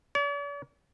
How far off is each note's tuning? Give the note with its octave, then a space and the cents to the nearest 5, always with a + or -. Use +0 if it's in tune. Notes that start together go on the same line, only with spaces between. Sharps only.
D5 -45